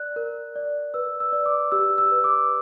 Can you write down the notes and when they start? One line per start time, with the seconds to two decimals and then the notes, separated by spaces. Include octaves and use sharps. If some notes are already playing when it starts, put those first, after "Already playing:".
Already playing: D5 F#6
0.16 A#4
0.56 D5
0.94 B4 E6
1.20 E6
1.33 D5
1.46 D6
1.72 G4 E6
1.98 E6
2.12 B4
2.24 D6